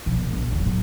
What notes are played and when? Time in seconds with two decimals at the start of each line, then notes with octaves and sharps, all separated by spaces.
0.06 B2 F3
0.19 A#2
0.33 A#1
0.52 D#1 F#3
0.66 A2 F#3